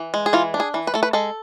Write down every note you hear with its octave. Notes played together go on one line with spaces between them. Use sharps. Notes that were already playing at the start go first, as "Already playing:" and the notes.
Already playing: E3
G#3
G#4
E3 F4
D4
G#4
E3
B4
A3 A4
B4
G#3 A4